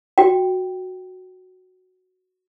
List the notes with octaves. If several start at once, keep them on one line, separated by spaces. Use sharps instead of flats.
F#4 G5